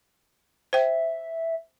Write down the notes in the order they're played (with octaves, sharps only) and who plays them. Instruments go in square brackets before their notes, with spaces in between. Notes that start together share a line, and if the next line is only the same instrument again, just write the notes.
[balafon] C5 G5 [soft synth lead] E5